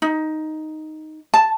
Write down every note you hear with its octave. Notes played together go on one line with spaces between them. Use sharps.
D#4
A5